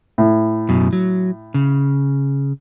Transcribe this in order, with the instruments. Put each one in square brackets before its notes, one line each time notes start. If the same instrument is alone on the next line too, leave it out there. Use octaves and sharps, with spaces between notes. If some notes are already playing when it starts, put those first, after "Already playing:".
[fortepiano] A2
[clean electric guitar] F#2 B2
F#3
C#3